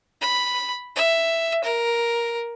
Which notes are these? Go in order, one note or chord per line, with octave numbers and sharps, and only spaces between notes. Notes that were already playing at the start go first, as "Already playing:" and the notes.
B5
E5
A#4